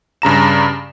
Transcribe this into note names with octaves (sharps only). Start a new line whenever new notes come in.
G2 C#3 A#5 E7